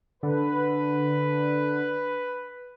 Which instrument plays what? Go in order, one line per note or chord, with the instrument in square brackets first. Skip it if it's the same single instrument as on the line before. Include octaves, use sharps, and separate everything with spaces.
[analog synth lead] D3 [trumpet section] B4